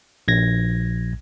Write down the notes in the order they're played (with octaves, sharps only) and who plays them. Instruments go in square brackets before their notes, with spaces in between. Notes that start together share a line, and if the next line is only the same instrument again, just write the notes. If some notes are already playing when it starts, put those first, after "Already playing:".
[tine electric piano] A#1 G#6 A#6